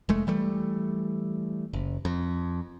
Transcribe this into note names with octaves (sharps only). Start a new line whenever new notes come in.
F1 G#3 A3
E3 G3 A3
F#1
F2